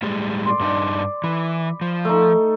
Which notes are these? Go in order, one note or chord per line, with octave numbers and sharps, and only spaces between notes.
A2 G3 G#3
D5 C6
G2 D4 D#4
E3 B5
F3
A3 D#4